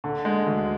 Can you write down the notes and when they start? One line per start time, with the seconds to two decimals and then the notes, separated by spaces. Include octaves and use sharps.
0.04 D3
0.25 G#3
0.47 D2